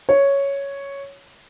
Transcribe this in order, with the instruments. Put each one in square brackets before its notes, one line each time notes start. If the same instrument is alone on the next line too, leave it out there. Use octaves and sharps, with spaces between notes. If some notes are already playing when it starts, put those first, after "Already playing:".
[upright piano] C#5